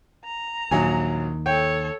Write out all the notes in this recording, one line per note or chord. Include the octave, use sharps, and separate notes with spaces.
A#5
A#1 D#2 D#3 F#3 G#5
A4 C#5 G5